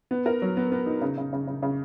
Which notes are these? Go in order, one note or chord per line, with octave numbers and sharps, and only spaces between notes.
B3
A#4
F#3
B3
B3
D#4
C#3
C#3
C#3
C#3
C#3